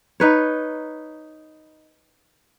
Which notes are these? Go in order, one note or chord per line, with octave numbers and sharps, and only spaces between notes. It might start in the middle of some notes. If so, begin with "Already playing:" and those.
D#4 B4 C#5